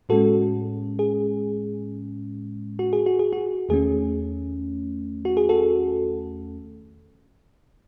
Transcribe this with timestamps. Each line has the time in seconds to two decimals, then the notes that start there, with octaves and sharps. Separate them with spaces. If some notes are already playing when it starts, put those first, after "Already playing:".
0.09 A2 G#3 C#4 F#4 A4
0.99 G#4
2.79 F#4
2.93 G#4
3.06 F#4
3.19 G#4
3.33 F#4
3.69 E2 D#3 A3 C#4 G#4
5.25 F#4
5.37 G#4
5.49 F#4 A4